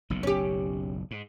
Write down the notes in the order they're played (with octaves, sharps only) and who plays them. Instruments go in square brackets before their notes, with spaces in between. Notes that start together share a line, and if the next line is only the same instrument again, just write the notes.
[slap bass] F#1 B1 B2
[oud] C#4 G4
[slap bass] G#2